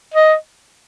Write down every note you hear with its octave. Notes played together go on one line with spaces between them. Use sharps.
D#5